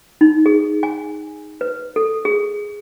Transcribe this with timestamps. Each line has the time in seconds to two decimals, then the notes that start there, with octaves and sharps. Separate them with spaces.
0.21 D#4
0.46 G#4
0.83 G#5
1.61 B4
1.96 A4
2.25 G#4